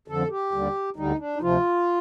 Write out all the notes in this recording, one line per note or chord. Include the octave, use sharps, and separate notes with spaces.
F2 D3 F3 A4
G4
D#2 D3 G3
D2 D3 G3 D#4
D4
D#4
D2 C3 F3 F4